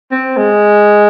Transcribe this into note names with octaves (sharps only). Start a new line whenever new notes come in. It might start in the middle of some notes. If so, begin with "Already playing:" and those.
C4
G#3